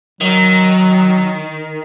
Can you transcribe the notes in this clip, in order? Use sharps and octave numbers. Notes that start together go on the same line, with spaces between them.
D#3 F#3